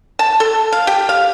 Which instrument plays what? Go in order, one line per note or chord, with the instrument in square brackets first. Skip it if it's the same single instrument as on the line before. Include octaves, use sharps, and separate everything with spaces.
[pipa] A5
A4
F5
G4
F5